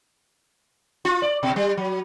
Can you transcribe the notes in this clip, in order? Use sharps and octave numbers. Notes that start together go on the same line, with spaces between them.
F4
D5
B2
G3
F#3